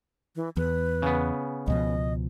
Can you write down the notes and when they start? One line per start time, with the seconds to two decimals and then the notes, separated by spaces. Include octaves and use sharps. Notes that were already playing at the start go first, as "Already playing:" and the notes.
0.36 E3
0.57 E2 B4
1.02 C#3 B3
1.68 C#2 B2 F3 D#5